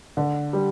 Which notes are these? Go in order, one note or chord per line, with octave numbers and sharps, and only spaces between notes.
D3
G3